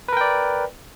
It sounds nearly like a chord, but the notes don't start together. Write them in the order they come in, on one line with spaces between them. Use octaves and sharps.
B4 A#4 G5 D5